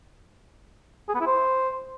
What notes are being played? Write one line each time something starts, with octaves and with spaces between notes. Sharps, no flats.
G#4
B3
E4
C5